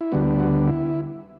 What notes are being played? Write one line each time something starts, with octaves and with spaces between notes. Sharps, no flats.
E4
D2 D3 G3 B3 F#4
F#4
E4